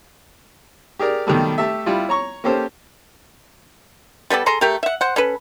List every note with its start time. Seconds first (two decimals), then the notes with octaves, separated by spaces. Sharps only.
1.00 G4 G#4 A#4 D5
1.27 B2 D#3 F#3 G3 A3
1.58 A3 G4 A4 E5
1.86 G3 E4 F4
2.09 C#5 A#5 C#6
2.44 A#3 C#4 G4 A4 C5
4.30 G3 B3 A4 D5
4.46 G#4 A4 A#5 C6
4.61 A3 G4 A#4
4.83 E5 F#5
5.01 C5 F#5
5.16 C#4 A4 B4